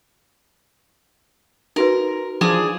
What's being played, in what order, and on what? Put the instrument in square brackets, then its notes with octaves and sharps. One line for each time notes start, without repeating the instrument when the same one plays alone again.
[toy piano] D#4 F#4 B4 [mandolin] A#4
[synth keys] F3 [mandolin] D4 G#4 G#5 [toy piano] F4